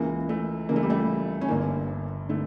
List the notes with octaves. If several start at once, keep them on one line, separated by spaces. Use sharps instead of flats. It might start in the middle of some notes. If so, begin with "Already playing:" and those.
Already playing: C#2 C#3 E3 A#3
A3
C#2 C#3 E3 A#3
A3
G3
A3
C#4
G1 G2 D3 A#3
D3 A3